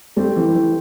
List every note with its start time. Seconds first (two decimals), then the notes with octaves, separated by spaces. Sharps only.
0.16 G3 A3 C4 G4
0.36 E3
0.54 E3